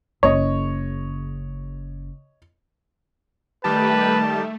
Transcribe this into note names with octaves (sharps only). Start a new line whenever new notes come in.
F#1 C#3 C#5 D#5
D#3 G3 A3 G4 B4 A5